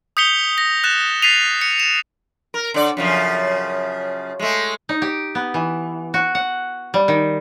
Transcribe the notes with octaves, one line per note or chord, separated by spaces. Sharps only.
D#6 G6 B6 C#7 F7 G7
A#6
F#6 A6 E7
A6 B6 C7 D#7 F7
C#7
A6 E7
A#4
D3 D5
F#2 C#3 F3
G#3 A3
D#4
G4
B3
E3
F#4
F#5
G3
D#3